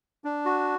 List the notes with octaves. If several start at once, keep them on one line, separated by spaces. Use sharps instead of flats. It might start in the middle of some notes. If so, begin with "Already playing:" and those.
D4
F#4